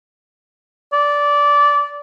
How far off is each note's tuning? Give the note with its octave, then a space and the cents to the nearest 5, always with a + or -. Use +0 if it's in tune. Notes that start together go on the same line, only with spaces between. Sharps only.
D5 -15